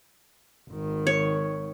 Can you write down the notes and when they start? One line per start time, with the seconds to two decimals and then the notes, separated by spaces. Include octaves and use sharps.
0.70 G#1 D#3
1.07 C#5